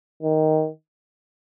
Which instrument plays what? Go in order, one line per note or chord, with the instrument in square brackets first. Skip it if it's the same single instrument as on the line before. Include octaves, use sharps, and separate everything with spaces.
[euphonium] D#3